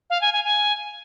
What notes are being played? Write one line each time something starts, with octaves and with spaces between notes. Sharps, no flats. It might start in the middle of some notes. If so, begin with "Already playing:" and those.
F5
G#5
G#5
G#5